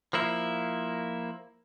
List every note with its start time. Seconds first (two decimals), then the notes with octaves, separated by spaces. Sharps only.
0.13 F3 A#3 E4